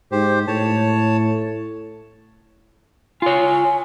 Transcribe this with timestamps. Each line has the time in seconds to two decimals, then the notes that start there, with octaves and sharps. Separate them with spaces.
0.12 G#2 G4 C5
0.47 A2 C#5 A5
3.22 F4 C#5 G#5